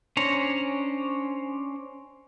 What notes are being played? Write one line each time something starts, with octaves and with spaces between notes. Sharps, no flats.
C#4 D4 C5 C#5 A#5